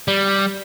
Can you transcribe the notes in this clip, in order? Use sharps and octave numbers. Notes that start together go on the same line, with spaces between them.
G3